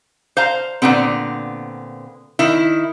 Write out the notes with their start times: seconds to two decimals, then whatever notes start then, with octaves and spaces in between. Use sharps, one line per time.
0.37 C5 F5 A#5
0.82 A#2 D3 A3 B3 C4
2.39 D#3 E4